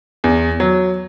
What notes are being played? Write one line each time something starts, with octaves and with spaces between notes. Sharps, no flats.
E2
F#3